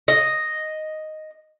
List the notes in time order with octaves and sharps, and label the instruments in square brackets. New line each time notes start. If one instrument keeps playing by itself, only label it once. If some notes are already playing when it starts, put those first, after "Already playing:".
[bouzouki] D#5